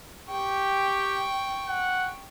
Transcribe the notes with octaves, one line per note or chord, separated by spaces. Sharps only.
G4 G5 C#6
F#5